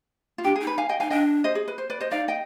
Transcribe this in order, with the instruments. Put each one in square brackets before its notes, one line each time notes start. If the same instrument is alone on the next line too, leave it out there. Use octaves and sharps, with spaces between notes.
[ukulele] F4
[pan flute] D4 [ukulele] G4
[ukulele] G#4
[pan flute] D#4
[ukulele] B4
F5 G#5
D#5 G5
[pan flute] D#4 [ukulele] F5 G#5
[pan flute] D4 [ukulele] D#5 G5
[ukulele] C5 D#5
G#4
B4
C5
B4 D5
C5 D#5
[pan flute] D#4 [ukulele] D5 F5
[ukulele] D#5 G5